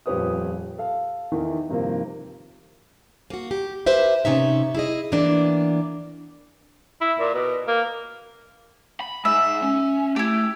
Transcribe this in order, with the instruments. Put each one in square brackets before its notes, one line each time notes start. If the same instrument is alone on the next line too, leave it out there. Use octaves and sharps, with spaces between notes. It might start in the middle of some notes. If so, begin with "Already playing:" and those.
[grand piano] D#1 F2 G4 B4 C#5 D#6
A4 F5
E2 D#3 E3
G2 C3 D#3 F3 A#3 C4
[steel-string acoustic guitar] A#3 F#4
G4
G4 B4 C5 E5
C3 C#4 D#4 E5
E4 G#4 D#5
E3 A#3 B3 D4
[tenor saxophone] E4
A#2
B2
A#3
[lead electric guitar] B5
[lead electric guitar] G#3 D#4 [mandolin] E5
[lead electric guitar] C#4
[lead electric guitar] A3 [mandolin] E4 G4